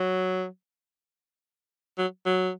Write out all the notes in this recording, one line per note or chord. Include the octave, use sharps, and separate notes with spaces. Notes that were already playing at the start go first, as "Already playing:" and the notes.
Already playing: F#3
F#3
F#3